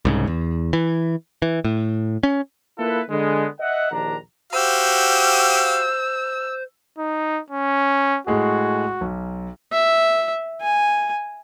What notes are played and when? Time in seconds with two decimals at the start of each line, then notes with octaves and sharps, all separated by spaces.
0.05 C2 G#2 C#3
0.27 E2
0.73 E3
1.42 E3
1.65 A2
2.23 C#4
2.78 A#3 E4 F4 A4 B4
3.09 D3 G#3 B3
3.60 D#5 E5 F#5
3.91 A#1 D#2 D#3 D4 A#5
4.53 F#4 G4 C5 F5 E6
6.98 D#4
7.50 C#4
8.27 A2 G#3 F#4 G#4
9.01 B1
9.72 E5
10.61 G#5